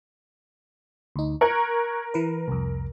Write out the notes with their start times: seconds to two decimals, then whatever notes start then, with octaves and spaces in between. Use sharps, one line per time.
1.16 D2 D#4
1.41 A#4 C#6 F#6 G#6
2.14 E3 B4
2.48 C2 F2